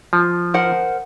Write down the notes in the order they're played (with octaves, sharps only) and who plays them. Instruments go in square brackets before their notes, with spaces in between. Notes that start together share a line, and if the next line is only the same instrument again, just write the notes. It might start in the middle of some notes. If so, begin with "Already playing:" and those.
[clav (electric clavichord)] F3
[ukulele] A#4 C5 F#5